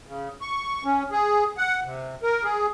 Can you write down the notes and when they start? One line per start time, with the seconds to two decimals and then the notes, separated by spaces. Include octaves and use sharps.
0.06 C#3
0.41 C#6
0.84 C#4
1.12 G#4
1.58 F#5
1.84 C3
2.23 A#4
2.44 G#4